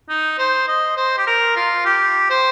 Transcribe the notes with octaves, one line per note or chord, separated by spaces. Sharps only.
D#4
C5
D#5
C5
G4
A#4
F4
G4
C5